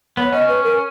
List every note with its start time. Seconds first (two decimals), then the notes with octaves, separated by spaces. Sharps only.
0.17 B3 C#5
0.32 C#4 D#5
0.48 B4
0.64 A#4